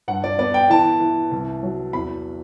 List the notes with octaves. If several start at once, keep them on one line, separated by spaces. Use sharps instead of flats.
G2 F#5
D5
B3 D5
G5
E3 A5
E3
C2
F#3
E2 B5